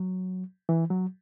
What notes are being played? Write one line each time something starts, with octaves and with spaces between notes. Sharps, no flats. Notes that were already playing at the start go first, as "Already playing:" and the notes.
Already playing: F#3
E3
F#3